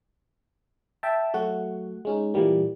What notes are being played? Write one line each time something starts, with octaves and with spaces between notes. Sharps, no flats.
E5 G5 A5
F#3 A3 F#4 F#5
G#3 C#4 D#4
A#2 E3 G3 A#3